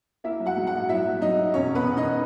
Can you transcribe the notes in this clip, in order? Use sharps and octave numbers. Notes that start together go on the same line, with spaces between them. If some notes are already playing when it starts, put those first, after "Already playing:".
A#3 E4 E5
F#3
F#4 F#5
G#2
F#4 F#5
A#1
F#3 E4 E5
F#3
F#3 D#4 D#5
F#3
E1 C#4 C#5
E1 B3 B4
E1
D#4 D#5